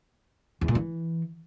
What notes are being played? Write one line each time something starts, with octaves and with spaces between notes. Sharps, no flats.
E2
A#2
E3